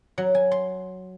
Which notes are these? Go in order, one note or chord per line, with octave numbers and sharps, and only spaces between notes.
F#3
G#5
C6